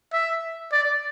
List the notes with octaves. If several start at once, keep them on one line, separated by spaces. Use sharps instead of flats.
E5
D5